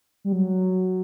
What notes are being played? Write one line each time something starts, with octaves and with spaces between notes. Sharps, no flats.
G3
F#3